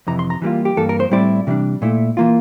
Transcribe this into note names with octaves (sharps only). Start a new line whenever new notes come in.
F2 C3 E3 A#5
C6
A#5
E3 G3 A#3 F4
G4
G2 E3 A#3 A4
A#4
C5
A2 G3 C4 E4 D5
C3 E3 G3 D4
A#2 A3 E4
E3 A#3 F4